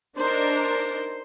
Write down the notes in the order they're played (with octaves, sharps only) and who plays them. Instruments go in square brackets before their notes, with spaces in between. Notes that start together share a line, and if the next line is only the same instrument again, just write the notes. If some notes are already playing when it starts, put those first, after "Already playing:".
[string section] D4 D#4 A#4 [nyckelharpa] C5